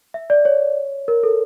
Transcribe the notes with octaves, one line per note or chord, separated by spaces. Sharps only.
E5
D5
C#5
A#4
A4